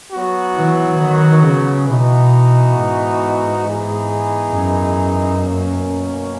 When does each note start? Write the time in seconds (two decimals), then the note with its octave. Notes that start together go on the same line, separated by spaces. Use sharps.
0.12 F#3 B3 F#4
0.56 E3
1.00 D#3
1.44 C#3
1.87 B2 E3 B3 D#4 F#4
2.75 G#2
3.63 E3 B3 D#4 G#4
4.51 F#2
5.39 B2 A#3 C#4